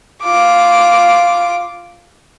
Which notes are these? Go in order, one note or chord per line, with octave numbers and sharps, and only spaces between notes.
F4 D6